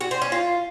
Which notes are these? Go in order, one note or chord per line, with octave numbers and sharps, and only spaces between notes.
F#4
C5
C#4
F4